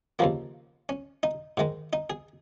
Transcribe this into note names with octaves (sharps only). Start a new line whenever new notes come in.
D#2 C#3 F3 A#3
C#4
D#4
G#2 D#3 G#3
D#4
G#4